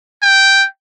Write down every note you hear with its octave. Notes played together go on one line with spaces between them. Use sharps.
G5